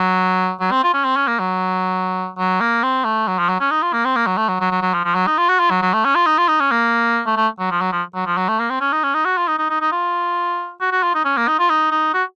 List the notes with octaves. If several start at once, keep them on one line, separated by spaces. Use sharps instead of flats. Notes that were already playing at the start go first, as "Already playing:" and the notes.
Already playing: F#3
F#3
C4
F4
C#4
C4
C#4
A#3
F#3
F#3
A#3
C4
A3
F#3
F3
F#3
C#4
D#4
F4
A#3
C4
A#3
F#3
A3
F#3
F#3
F#3
F#3
F3
F3
F#3
D#4
F4
F#4
F4
F#3
F#3
A3
C#4
F4
D#4
F4
D#4
C#4
A#3
A3
A3
F#3
F3
F#3
F3
F#3
F3
F#3
A3
A#3
C4
C#4
D#4
C#4
D#4
F#4
F4
D#4
D#4
D#4
D#4
F4
F#4
F#4
F4
D#4
C#4
A#3
D#4
F4
D#4
D#4
F#4